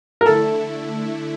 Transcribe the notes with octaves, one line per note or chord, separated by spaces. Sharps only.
A#4
D3 A3 E4 A4